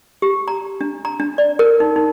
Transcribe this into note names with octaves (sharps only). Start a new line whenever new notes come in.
G4
A#5
D4
A#5
D4
D5
A#4
D#4
D#4